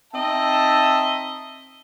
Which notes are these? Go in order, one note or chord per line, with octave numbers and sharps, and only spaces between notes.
C4 D#4 D#5 E5 A5